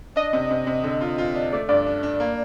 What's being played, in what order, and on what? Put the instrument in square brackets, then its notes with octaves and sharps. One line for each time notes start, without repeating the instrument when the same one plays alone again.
[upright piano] D4 [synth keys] D#5
[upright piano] C3
C3
C3
D3
F4
F4
D4
[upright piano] A3 [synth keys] D5
[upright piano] G2 [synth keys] D5
[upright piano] D4
D4
A#3